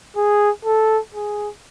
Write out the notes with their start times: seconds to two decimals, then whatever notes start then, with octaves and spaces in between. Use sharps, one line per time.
0.16 G#4
0.65 A4
1.15 G#4